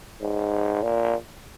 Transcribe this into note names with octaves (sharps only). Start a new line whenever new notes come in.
G#2
A#2